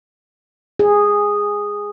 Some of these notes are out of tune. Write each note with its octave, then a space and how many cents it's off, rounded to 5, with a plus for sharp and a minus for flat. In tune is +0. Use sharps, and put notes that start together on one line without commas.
G#4 -10